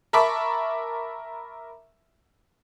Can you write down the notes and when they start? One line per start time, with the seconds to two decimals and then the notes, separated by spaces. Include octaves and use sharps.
0.13 A#4 E5 A5 B5 C#6 D6